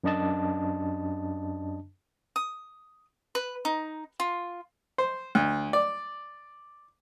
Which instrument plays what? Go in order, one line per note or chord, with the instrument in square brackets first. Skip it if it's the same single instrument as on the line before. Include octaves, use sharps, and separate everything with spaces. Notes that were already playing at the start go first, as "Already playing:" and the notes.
[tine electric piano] F#2 D4 D#5 A5
[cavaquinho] D#6
B4
D#4
F4
[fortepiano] C5
D2
D5